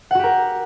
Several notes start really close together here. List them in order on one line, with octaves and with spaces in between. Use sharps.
F#5 F#4 G4 A#4